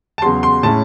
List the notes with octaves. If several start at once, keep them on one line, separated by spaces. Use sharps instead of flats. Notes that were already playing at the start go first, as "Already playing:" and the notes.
A5
E2 C#3 F#3 C6
C6
A2 G#3 C#4 E4 A5